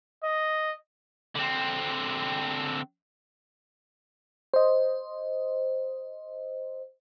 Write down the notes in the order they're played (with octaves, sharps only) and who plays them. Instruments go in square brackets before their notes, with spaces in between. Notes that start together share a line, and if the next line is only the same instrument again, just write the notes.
[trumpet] D#5
[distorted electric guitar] D3 C4
[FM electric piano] C5 D#5